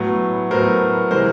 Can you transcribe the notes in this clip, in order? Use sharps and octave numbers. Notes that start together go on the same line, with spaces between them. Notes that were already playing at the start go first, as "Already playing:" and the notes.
Already playing: A2 F#3 B3
A2 F#3 B3 A#4 C5
C3 E3 G#3 A#4 C5